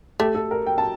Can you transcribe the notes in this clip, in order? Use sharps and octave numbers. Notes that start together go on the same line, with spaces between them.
A3 G4
A4
A#4
G5
A5